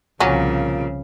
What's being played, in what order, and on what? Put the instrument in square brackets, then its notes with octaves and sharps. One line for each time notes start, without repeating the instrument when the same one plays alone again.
[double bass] C2 F3 [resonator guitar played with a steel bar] A#2 [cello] C#3 [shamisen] F#3 C#4